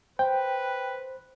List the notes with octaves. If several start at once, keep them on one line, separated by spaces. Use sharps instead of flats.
B4 C5 G5